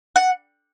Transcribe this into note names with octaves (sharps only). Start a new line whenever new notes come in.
F#5